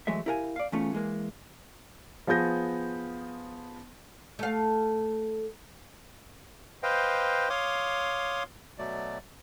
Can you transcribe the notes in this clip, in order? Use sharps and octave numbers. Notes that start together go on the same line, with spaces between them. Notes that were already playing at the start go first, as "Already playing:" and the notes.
E3 F#3 G#3 A3 E5
E4 G4 A#4 F5 F#5 G#5
D5 F5
E2 A2 A3 C#4 F4
E3 G#3 A#3
F3 B3 G#4 G6 A#6
A3 F5
B4 C5 D#5 F5 G5
C#5 F5 C6 D6 D#6
B2 F#3 A3 D5